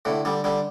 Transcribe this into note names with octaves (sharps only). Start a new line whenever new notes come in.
A2 D3
D3 G3
D3 G3